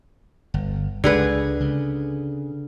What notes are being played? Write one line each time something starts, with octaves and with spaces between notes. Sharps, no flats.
G1
C#2 D3 G#3 G#4 B4
C#3